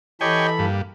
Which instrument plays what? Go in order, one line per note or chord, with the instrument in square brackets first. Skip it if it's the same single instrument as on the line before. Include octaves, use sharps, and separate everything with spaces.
[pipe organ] E3 A4 B5 [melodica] G4 D#5 [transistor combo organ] C#5 G5 G#5
[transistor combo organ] G2 [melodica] A#3